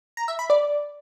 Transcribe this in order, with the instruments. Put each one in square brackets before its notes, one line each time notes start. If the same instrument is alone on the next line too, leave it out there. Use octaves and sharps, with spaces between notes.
[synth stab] A#5
E5
B5
D5